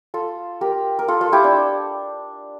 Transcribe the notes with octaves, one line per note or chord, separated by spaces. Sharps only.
F4 A4
G4 A#4
A#4
F4 A4
F4 A4
E4 G4
D4